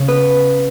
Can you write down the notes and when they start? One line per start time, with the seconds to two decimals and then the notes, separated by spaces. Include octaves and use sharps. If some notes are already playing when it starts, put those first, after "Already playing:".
Already playing: C#3
0.08 B3 B4